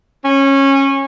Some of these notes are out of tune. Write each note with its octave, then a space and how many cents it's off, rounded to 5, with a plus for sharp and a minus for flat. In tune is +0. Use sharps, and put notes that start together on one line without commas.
C#4 -20